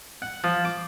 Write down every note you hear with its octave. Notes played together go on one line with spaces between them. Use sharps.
F#5
F3
D6